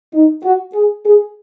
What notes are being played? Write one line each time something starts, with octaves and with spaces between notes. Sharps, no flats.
D#4
F#4
G#4
G#4